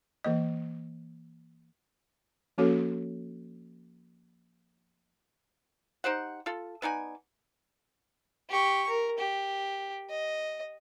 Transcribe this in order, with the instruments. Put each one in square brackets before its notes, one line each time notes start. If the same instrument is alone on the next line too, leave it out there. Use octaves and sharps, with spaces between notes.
[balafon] E3 A#3 D#5
F3 A#3 C#4 F#4 A4 C#5
[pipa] D#4 G4 C5 F#5
F4 A4
B3 D#4 D5 G#5
[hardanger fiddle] G4 C#6
A#4
G4
D#5